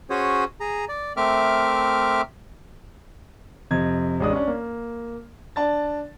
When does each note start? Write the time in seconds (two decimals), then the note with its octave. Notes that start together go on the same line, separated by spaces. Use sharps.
0.10 C#4 F#4 G#4 C5 C#5
0.60 G#4 A#5
0.89 D5
1.17 A3 C4 A#4 E5 D6 F6
3.71 F2 C3 D#5 G#6
4.20 A1 G#3 D4 D#6
4.32 C#4 D4
4.48 A#3
5.56 D4 A5 A6